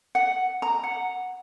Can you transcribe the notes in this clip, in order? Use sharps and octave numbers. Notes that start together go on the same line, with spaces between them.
F#5
A#5
F#5